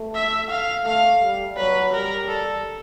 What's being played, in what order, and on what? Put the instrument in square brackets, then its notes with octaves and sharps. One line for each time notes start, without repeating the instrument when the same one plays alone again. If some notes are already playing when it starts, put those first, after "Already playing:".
Already playing: [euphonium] A3
[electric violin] E5
F5
[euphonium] A3 [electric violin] F5
[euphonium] G3
[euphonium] F#3 [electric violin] B4
[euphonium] G3 [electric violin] A#4
[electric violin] A4